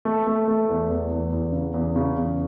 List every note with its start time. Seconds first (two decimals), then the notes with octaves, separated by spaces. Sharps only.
0.05 A3
0.27 A3
0.48 A3
0.69 E2
0.89 E2
1.11 E2
1.33 E2
1.52 C#3
1.74 E2
1.96 C#3
2.16 E2